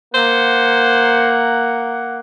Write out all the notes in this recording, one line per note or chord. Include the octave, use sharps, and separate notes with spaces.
A#3 C5 F#5